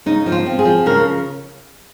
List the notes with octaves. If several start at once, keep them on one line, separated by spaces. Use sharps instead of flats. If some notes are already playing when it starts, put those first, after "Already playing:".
C#3 D#4
F3
F4
C4
G#4
F3
C#3 A#4